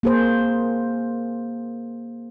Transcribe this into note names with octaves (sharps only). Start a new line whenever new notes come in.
A#3 G#4 C5